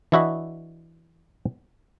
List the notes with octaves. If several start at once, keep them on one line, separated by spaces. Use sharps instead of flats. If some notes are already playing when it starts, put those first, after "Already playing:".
E3 D4 E4 F#4 D#5 E5